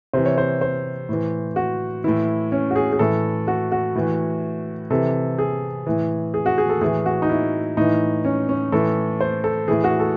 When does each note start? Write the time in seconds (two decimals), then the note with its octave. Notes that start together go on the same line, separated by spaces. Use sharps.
0.13 C3 E3 C5
0.26 C#5
0.38 C5
0.61 C5
1.09 A2 E3
1.56 F#4
2.04 A2 E3 E4
2.52 C#4
2.71 F#4
2.76 G#4
2.92 G#4
2.99 A2 E3 A4
3.48 F#4
3.72 F#4
3.95 A2 E3
4.90 C3 E3 A4
5.39 G#4
5.87 A2 E3
6.34 G#4
6.46 F#4
6.58 G#4
6.70 A4
6.81 A2 E3 G#4
7.06 F#4
7.22 D#4
7.29 E4
7.77 A2 E3 D#4
8.25 C#4
8.49 C#4
8.72 A2 E3 A4
9.21 C5
9.44 A4
9.68 A2 E3 G#4
9.84 F#4
10.00 A4